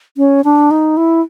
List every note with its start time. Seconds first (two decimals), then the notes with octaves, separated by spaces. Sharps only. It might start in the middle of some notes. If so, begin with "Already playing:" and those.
0.17 C#4
0.44 D4
0.71 D#4
0.97 E4